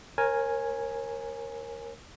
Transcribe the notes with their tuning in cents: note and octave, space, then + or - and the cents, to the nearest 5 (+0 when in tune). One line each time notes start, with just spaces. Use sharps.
A#4 +0 C#5 -40 G#5 +0